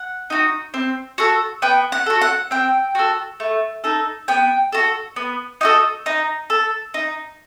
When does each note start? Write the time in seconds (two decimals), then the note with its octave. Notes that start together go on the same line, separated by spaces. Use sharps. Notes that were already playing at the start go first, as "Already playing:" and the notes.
Already playing: F#5
0.30 D#4 F#4
0.74 C4
1.18 F#4 A4
1.62 B3 G5
1.92 F#5
2.06 F#4 A4
2.21 F#5
2.51 C4 G5
2.95 F#4 A4
3.40 A3
3.84 D#4 A4
4.28 B3 G5
4.72 F#4 A4
5.16 B3
5.61 D#4 F#4 A4
6.06 D#4
6.50 A4
6.94 D#4